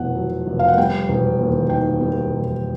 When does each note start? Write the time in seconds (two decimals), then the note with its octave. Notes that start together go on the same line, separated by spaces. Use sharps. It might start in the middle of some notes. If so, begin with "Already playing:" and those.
Already playing: F1 E2 B2 F#3 F#5
0.15 F#3
0.47 F1
0.59 F5
0.68 F#5
0.77 G3 G5
1.09 E1
1.39 D#2
1.70 D#3 G5
2.01 G3
2.32 E1